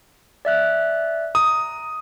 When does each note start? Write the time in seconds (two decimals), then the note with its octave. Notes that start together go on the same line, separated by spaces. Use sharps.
0.45 D5 E5 F#6
1.35 A#5 D#6